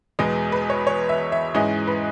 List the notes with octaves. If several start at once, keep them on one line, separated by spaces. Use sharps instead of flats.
E2 B2 G#3 B3 D#5
B4
C#5
C#5
E5
E5
G#2 E3 G#3 C#4 D#5
B4